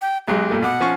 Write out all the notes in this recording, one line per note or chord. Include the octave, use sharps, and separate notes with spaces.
G5
B1 F#3 G#3 G4
G2 A#2 A3
B2 F#5 D6
F3 C#4 C#6